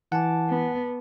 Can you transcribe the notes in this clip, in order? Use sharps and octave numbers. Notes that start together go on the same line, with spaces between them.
E3 F#5 G#5 A5 D6
B3